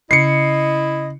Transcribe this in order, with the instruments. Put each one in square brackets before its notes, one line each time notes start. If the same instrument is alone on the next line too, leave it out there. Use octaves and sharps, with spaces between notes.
[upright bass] C#3 [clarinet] E4 [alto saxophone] D#5 [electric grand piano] C7 C#7